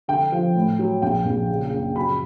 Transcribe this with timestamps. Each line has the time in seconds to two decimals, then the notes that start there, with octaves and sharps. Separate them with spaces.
0.08 D3 G5
0.32 F3
0.55 A2
0.79 F#3
1.02 A#1 G5
1.25 A#1
1.50 C#3
1.72 F#2
1.96 F#3 B5